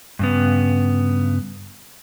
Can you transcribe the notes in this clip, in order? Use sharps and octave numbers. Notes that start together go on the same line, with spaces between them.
G2 C#3 B3